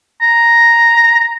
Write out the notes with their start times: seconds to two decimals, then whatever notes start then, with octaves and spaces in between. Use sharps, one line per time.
0.21 A#5